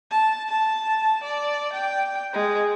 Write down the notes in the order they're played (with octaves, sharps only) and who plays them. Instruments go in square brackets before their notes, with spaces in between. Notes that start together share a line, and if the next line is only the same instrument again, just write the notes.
[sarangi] A5
A5
D5
G5
G#3